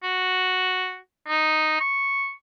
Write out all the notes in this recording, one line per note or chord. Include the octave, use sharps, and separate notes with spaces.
F#4
D#4
C#6